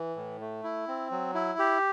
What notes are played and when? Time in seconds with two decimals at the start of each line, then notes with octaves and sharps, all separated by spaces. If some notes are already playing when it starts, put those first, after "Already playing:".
Already playing: E3
0.16 A2
0.41 A3
0.64 E4
0.88 C4
1.11 F#3
1.34 E4
1.59 G4